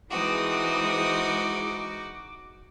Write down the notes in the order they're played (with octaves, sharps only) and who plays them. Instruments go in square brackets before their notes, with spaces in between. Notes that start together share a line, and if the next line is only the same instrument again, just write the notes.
[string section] E3 G#3 [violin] C4 D#6 [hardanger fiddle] D#4 F#4 [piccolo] D6